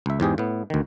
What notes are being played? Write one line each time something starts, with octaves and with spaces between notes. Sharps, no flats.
C#2 E5
E2 G#2 G4 G#4
A2 B3
D2 D#3